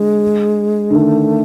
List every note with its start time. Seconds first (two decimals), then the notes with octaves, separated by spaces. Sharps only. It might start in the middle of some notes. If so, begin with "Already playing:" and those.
Already playing: D3 G#3
0.90 D3
0.95 D#3 A3